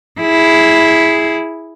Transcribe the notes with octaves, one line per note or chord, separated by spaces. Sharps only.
E4 G#4